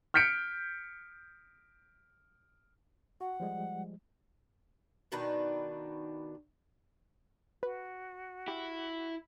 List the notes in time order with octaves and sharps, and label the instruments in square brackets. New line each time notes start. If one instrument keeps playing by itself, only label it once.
[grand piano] F6 G6 B6 C#7 D7
[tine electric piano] F#4 [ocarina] F#5
[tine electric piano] F3 G3 G#3
[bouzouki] B2 D#3 D4 B4
[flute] F#4 [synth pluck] B4
[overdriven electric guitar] E4 [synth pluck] G4